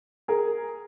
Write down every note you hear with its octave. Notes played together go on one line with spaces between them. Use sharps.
G#4 A#4